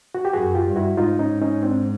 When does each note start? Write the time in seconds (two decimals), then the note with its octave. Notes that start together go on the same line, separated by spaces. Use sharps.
0.15 F#4
0.25 G4
0.33 F#2 F#4 G#4
0.55 F4 G4
0.66 G2
0.76 E4 F#4
0.98 G#2 D#4 F4
1.19 C#4 D#4
1.42 C#4 D#4
1.63 C4 D4